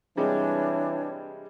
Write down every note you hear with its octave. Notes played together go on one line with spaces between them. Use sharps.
C3 E3 G3 G#3 D4 C#5 A5